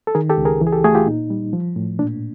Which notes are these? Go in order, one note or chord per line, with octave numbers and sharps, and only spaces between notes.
A4
D#3 G#4 A#4
G4 A4
C#2
G#4 A#4
E3
G#4
G4 A4
A3 F#4 G#4
F4 G4
A#2 D#4
G3
F3
A2
A#2 D4